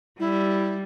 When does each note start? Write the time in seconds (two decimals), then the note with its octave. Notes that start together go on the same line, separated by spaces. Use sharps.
0.20 G3 E4